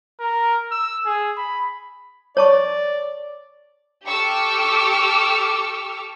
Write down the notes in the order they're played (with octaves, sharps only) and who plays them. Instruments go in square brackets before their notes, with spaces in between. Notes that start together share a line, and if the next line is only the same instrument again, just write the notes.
[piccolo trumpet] A#4
E6
G#4
B5
[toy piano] C#5 A5 C#6 [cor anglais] D5
[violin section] G4 A4 C#6 D6 E6 F6